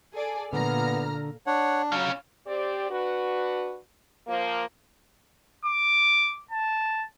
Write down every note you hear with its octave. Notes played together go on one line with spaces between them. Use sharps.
G#4 A4 D5
A#2 D3 B3 A#5 F6
D4 C#5 F#5
F#3 C#4 F4
C4 G4 D5
D4 F#4 B4
F3 A#3
D6
A5